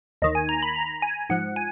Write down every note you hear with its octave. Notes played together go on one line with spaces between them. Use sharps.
D#2 D#3 D#5
G#5
A#5
B5
A#5
G#5
G#2 F3 F#5
G#5